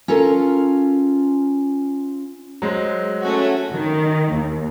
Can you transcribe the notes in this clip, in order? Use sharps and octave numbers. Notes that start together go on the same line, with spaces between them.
C#4 F4 A4 A#4
F#3 G#3 C5
A3 C#4 F#4
D#3
D#2